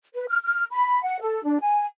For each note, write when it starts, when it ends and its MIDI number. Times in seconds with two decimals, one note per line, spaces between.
0.14 0.25 71
0.30 0.38 89
0.43 0.65 89
0.71 1.01 83
1.02 1.19 78
1.21 1.42 69
1.43 1.58 62
1.61 1.85 80